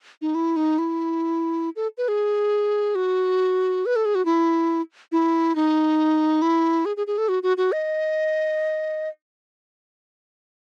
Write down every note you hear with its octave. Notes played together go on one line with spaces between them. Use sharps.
D#4
E4
D#4
E4
A4
B4
G#4
F#4
B4
A4
G#4
F#4
E4
E4
D#4
E4
G#4
G#4
G#4
A4
F#4
F#4
F#4
D#5